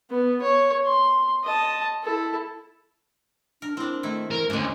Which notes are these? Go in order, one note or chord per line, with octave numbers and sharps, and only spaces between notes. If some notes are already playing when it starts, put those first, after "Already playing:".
B3
C#5
C6
D#5 A5
E4 A4
D4 A#4
C4 D4 E4
D#3 A3 E4
E3 A#4
D2 G#2 G#3 A#3 C#4